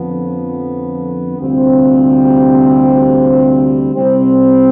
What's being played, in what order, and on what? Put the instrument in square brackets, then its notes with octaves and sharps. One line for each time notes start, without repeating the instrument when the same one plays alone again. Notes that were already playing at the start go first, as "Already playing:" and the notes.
Already playing: [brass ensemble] F2 D3 F3 B3
D2 C3 G3 C4 F4
C2 C3 G3 C4